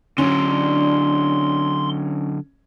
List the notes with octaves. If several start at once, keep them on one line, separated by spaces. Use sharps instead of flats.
D3 F#3 C#4 D4 C6